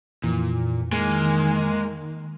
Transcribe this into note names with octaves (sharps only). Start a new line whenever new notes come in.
F2 A#2 E3
D#3 G#3 A#3